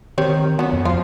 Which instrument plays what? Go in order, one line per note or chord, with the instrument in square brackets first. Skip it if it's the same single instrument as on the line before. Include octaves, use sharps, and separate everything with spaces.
[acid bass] D#3 [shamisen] C4 G4 C#5
[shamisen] F#3 C#4 [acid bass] B3
[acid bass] F2
[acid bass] F3 [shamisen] F4